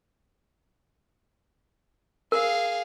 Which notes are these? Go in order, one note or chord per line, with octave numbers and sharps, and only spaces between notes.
G#4 A#4 F5